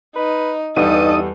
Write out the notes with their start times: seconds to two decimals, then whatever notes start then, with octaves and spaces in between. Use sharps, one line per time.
0.16 D#4 B4
0.76 E2 G2 G3 D#4 A4 D#6